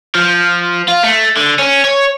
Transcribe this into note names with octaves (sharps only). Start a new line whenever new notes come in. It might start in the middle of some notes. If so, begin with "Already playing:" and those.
F3
F4
A3
D3
C#4
C#5